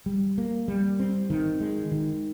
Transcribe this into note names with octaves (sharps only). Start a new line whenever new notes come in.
G3
A#3
G3
C4
D#3
G#3
D#3